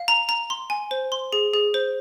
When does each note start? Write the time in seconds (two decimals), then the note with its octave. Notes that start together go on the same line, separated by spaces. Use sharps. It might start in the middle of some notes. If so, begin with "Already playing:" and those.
Already playing: F5
0.08 A#5
0.29 A#5
0.50 C6
0.70 G#5
0.91 C5
1.12 C6
1.33 G#4
1.54 G#4
1.74 C5